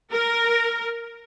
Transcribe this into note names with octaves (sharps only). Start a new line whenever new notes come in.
A#4